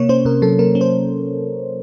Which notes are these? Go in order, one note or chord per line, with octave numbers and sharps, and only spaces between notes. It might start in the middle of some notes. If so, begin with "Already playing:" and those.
Already playing: C3 A#3 C#5
C#4 C5
C3 A#4
F#3 A4
A#3 A#4
C#4
C5